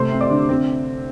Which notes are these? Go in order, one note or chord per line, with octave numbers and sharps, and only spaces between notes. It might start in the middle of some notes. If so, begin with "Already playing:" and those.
Already playing: C3 A3 C5 C6
C4
D5 D6
D3
C4